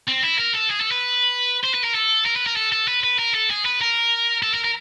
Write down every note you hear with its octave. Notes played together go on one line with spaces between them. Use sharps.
C4
E4
A#4
A4
G#4
A4
B4
C5
B4
A#4
A4
A#4
B4
A#4
A4
A4
B4
B4
A#4
A4
G#4
B4
A#4
A4
A#4
A#4